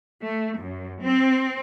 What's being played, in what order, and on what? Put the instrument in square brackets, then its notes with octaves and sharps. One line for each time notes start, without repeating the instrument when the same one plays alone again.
[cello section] A3
F#2
C4